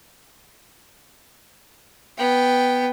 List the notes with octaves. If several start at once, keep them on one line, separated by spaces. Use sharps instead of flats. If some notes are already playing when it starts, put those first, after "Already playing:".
B3 G5